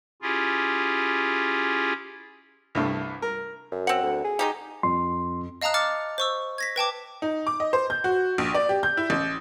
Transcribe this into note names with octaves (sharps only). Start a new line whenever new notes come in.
C#4 E4 F4 G4 G#4
C2 G2 A3
A#4
F#2
C4 F#5
D2
G#4
G#3 D#4 G4
F2 C6
D#5 F5 A5 A#5 D#6 F#6
D6 F6 A6 C#7
C5 C#6 E6
G#6 A#6 B6
B4 G5 A5 D6
D#4
D6
D#5
C5
G6
F#4
A#1
D5
G4
G6
E4
A1